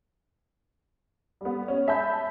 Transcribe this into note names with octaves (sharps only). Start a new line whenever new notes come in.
G3 B3
C#4
E5 G#5 A5 B5 G6